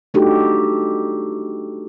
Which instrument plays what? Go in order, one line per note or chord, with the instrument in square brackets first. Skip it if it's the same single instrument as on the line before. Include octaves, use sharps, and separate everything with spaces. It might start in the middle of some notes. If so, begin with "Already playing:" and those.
[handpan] A3 D4 D#4 F#4 G4 A4